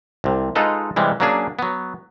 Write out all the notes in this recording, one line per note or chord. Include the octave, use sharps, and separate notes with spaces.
C2 C3
G#3 D#4 F4 A4 B4
C3 E3 G3 G#3
F#3 A#3 C#4 D4 G#4
F#3 B3